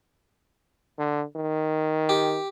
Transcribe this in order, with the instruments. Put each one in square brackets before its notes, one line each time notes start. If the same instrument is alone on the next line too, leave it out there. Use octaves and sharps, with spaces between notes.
[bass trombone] D3
D#3
[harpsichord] G4